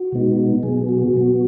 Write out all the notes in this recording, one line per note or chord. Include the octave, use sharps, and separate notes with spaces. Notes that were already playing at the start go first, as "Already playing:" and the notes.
Already playing: F#4
B2 G#3 B3 D#4
B2 F#3 B3 G#4
F#4
B2 F#3 B3